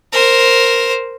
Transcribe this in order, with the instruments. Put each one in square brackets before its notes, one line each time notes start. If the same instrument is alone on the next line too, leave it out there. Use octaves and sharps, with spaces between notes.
[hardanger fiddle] A#4 C5